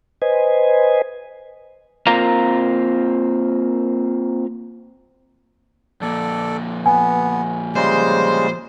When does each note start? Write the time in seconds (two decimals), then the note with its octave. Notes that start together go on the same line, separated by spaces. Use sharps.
0.22 B4 C5 D#5 G#5
2.07 A#3 C4 F4 A#4 F5 A#5
6.01 F2 A#2 A4 D5
6.86 B3 G#5
7.75 C#3 G3 G#3 C5